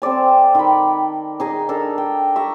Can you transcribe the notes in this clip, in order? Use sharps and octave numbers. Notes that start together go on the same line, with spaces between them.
C4 A4 D5 G#5
D#3 B5
D#4 G#4 D#5
D4 A4 A#4
G5
E5 A#5 C#6